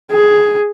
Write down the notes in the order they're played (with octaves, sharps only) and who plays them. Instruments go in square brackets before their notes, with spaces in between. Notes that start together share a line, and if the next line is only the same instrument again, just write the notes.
[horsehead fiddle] G#4